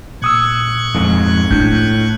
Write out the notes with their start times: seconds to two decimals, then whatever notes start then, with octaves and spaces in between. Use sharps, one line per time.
0.22 A#2 C#6 D#6 E6 F#6 G#6
0.95 F2 G#2
1.51 A2 D4 F4 G6